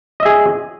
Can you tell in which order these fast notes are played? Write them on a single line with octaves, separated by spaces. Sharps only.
D#5 E5 G#4